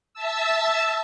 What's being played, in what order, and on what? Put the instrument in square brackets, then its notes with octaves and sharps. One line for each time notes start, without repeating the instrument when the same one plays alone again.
[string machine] E5 A5 E6